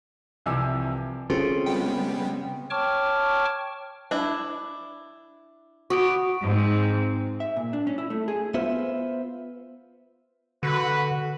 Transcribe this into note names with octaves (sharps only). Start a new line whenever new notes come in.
C2 C3 E3 F3 G#5 E6
C#3 C4 F4 G#4 A4
G3 G#3 B3 G5
C#5 G5 A5 C#6 D6 F6
D4 E4
F#4 D5 B5 C#6 D#6 D7
G#2 C4
E5
A#2
D4
C#4
E4
A3
G#4
B3 F4 C5 E5
D3 F#4 B4